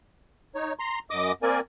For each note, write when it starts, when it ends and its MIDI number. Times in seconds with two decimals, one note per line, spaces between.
0.55 0.73 63
0.55 0.73 73
0.79 0.99 82
0.79 0.99 84
1.10 1.32 42
1.10 1.32 75
1.10 1.32 86
1.10 1.32 87
1.43 1.60 58
1.43 1.60 60
1.43 1.60 70
1.43 1.60 74
1.43 1.60 80